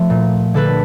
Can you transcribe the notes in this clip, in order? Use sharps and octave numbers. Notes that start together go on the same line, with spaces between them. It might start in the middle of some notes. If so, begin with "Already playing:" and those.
Already playing: F3 A3
A#2
D3 A4 B4